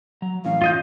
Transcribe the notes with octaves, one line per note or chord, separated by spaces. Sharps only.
F#3 A#5
A2 E3 C#4 F5
F4 D#5 G6